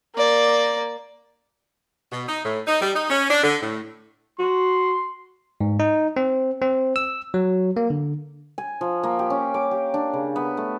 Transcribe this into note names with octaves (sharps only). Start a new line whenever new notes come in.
A#3 D5
B2
D#4
A2
D#4
G3
D#4
C#4
D4
D3
A2
F#4 C6
G#2
D#4
C4
C4
E6
F#3
A#3
D3
G#5
F3
A#3
G4
C#4
D6
G4
D4
C#3
B3
A3